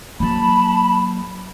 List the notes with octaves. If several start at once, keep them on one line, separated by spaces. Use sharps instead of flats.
F#3 A#3 A5 B5